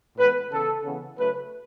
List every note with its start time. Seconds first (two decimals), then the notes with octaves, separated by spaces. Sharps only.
0.16 A2 E3 G#3 B3 B4
0.51 C#3 E3 B3 A4
0.84 C#3 E3 B3
1.18 C#3 F#3 A3 B4